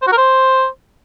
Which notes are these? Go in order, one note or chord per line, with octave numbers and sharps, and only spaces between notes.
C5
F#4
A#4
C5